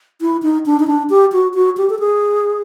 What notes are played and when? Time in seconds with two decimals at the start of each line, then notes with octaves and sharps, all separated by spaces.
0.21 E4
0.43 D#4
0.66 D4
0.80 D#4
0.87 D4
1.10 G4
1.32 F#4
1.54 F#4
1.77 G4
1.90 A4
1.99 G#4